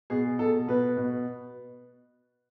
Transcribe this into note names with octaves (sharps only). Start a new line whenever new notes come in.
B2 G#4
B2 A4
B2 B4
B2